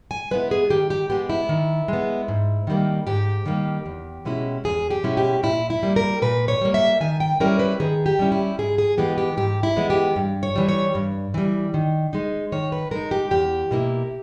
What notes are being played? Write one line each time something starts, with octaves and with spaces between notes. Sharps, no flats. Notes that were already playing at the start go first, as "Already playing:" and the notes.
G#5
G#3 B3 E4 B4
G#4
D#3 G4
G4
G#3 B3 G4
E4
D#3
G#3 B3
G#2
D#3 G3 A#3
G#2 G4
D#3 G3 A#3
E2
B2 G#3 C#4 E4
E2 G#4
G4
B2 G#3 C#4 E4
G4
A#2 E4
E4
G3 A#3
A#4
A#2 B4
C#5
G3 A#3
E5
D#3 G#5
G5
G3 C#4 E4 A#4
B4
D#3 G#4
G4
G3 C#4 E4
E4
G#2 G#4
G#4
E3 G#3 B3 G4
G4
G#2 G4
E4
E3 G#3 B3
G4
G2
C#5
E3 G3
C#5
G2
E3 G3
D#3
G#3 D#4
D#3 C#5
B4
G#3 D#4 A#4
G4
E2 G4
B2 A#3 E4